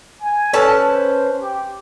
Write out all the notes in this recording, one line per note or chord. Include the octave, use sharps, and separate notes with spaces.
G#5
C#4 A4 B4 A5
C5
G4